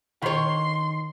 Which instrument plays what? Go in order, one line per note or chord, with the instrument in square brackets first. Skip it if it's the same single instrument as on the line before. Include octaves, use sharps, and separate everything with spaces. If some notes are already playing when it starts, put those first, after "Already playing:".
[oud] D#3 C#5 [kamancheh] C6